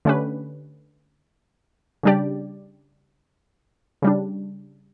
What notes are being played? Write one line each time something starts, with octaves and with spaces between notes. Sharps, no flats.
D3 A3 C#4 G4 B4
C#3 G3 D4 G4 D5
C#3 G3 D4